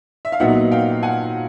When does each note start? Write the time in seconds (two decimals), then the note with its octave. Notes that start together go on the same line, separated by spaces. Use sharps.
0.25 E5
0.32 F5
0.40 A#2 F#3 B3 D#4 E5 F#5
0.71 F5 G5
1.03 F#5 G#5